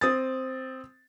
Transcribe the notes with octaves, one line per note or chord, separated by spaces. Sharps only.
C4 D#6 A6